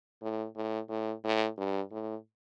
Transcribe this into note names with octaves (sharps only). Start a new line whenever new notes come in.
A2
A2
A2
A2
G2
A2